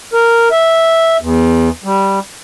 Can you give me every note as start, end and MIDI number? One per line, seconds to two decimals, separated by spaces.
0.13 0.49 70
0.51 1.17 76
1.21 1.69 40
1.84 2.19 55